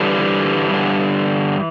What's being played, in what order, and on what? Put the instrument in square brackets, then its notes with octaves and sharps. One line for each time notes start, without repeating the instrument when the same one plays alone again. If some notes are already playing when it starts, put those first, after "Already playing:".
Already playing: [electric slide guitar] G2 D3 E3 G3
G2 D3